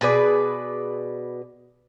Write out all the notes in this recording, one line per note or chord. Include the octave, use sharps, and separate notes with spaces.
B2 G#4 B4 D5